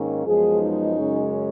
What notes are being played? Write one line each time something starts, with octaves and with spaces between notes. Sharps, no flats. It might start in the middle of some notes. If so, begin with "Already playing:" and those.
Already playing: G#2 D#3 A#3 C#4
F#2 F3 G#3 B3 G#4
D#4
F#2 C#3 G#3 C#4